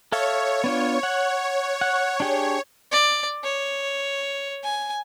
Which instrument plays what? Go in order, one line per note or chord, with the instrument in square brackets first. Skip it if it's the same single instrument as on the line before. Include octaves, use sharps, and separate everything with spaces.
[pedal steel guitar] A4 E5 F5 [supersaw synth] C#5
[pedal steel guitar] B3 D4 F4
F#5
F#5
D4 G4 G#4
[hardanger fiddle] D5
C#5
G#5